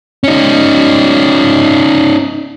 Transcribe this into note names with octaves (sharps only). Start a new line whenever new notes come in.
C#4 D#4